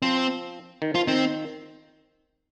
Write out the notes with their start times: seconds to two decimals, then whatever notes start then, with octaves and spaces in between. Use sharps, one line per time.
0.02 F3 C4
0.82 D#3
0.94 F3 F4
1.07 D#3 C4